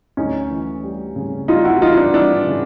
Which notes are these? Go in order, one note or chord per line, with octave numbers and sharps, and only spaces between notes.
D2 C#4 D#4
E3
G3
C#3
G3 D#4 F4
E4 F#4
E3 D#4 F4
D4
E3 D4 E4
C#3